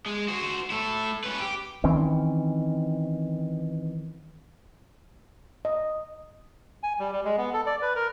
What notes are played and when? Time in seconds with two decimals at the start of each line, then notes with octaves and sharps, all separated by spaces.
0.06 G#3
0.28 F#4 C5
0.70 A3 E4
1.24 C#4 B4
1.40 G4
1.84 D#3 E3 C4 C#4
5.65 D#5
6.83 G#5
6.99 G3
7.12 G3
7.25 G#3
7.38 B3
7.53 A4
7.66 D5
7.82 B4
7.96 A#4